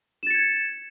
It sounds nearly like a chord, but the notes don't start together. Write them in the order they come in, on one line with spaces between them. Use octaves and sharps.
E7 A6 C#7 G#6